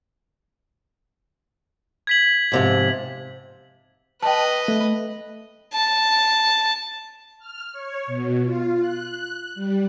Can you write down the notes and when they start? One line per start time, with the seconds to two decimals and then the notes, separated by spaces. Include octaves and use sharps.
2.07 G#6 B6 F#7
2.52 G#2 C3 F3
4.23 B4 D#5 G5 A5
4.68 A3
5.74 A5
7.39 F6
7.72 C#5
8.07 B2
8.42 F4
8.80 F#6
9.55 G3